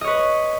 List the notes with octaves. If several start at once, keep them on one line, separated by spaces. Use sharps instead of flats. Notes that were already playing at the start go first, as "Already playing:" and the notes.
B4 C#5 D#5